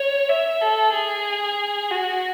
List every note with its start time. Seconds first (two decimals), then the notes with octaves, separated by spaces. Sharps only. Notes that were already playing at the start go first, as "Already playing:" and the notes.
Already playing: C#5
0.29 E5
0.62 A4
0.94 G#4
1.91 F#4